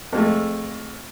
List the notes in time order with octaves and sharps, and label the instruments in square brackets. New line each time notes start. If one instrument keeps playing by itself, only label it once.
[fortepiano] F2 G#3 A3